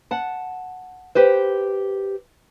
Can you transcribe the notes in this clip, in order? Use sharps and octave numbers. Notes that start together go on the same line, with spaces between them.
F#5 A5
G4 B4 C5